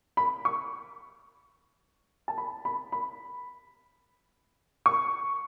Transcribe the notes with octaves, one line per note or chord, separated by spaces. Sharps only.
B5
C#6
A5
B5
B5
B5
C#6